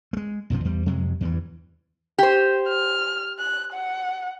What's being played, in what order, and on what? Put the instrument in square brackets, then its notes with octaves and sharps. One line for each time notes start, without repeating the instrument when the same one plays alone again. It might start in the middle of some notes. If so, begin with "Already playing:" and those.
[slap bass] G#3 A3
B1 F#2 C3 F3
E2 G3
F2 C3 F#3 G#3
E2 G2 E3
[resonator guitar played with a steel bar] G4 C5
[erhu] F6
F#6
F#5